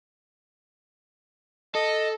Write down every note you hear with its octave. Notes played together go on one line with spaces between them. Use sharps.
A4 D#5